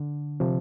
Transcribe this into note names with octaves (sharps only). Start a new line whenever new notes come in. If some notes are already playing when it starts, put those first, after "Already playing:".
Already playing: D3
C3 F3